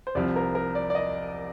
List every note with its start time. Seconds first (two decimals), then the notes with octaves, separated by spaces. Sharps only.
0.07 C5
0.15 C2 C3 F3 D5
0.36 A#4
0.55 A#4
0.75 D5
0.90 D5
0.95 D#5